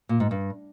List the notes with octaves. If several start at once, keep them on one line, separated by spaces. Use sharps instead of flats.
A#2
G#2
G2